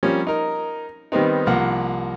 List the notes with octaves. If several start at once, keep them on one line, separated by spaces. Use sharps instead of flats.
F3 G3 A#3 C4 C#4
D#4 A#4
D#3 G3 B3 C4 D#4
C2 F3 A#3 F#5